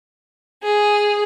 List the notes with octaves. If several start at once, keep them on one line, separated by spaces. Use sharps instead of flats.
G#4